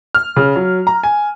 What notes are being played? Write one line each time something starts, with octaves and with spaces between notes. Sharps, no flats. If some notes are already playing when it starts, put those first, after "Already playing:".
F6
C#3
F#3
A#5
G#5